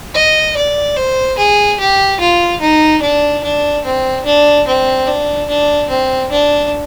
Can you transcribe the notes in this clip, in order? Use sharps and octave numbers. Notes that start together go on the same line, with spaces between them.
D#5
D5
C5
G#4
G4
F4
D#4
D4
D4
C4
D4
C4
D4
D4
C4
D4